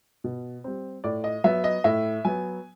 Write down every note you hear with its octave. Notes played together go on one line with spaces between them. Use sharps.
B2
G3 C4
A2 D5
D#5
F#3 B3 E5
D#5
A2 E5
F#3 B3 G#5